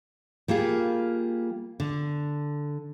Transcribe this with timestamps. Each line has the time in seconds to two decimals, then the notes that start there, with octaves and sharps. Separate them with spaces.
0.48 G3 A#3 F4 G#4
1.80 D3